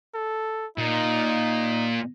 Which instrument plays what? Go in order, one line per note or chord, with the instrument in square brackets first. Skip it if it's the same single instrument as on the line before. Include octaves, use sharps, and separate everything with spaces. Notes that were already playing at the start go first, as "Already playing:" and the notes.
[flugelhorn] A4
[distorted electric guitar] A#2 [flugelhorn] D#4